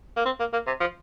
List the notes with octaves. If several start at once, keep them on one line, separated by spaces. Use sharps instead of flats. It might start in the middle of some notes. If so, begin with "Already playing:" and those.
A#3
C4
A#3
A#3
C3
F3